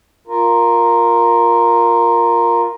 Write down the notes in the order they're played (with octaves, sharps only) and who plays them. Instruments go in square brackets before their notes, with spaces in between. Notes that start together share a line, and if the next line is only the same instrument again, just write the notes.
[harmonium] F4 A#4